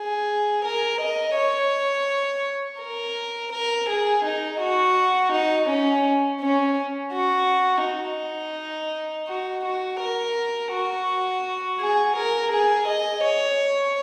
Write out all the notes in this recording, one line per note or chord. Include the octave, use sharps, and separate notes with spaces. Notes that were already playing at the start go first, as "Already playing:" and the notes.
Already playing: G#4
A#4
D#5
C#5
A#4
A#4
G#4
D#4
F#4
D#4
C#4
C#4
F#4
D#4
F#4
F#4
A#4
F#4
G#4
A#4
G#4
D#5
C#5